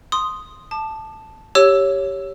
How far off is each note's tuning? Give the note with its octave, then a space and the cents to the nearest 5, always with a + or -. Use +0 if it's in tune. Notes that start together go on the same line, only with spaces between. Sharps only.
C6 +0 D#6 +0
A5 +0 D6 +40
G4 +0 C#5 +0 E6 +0